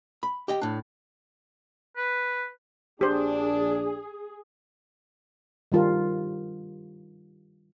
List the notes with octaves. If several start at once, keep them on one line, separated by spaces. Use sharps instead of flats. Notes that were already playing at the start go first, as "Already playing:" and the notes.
B5
G4 D#5 G5
A2 D4
B4
A#1 D4 G4 G#4 C5
D#3 G3 F4 A#4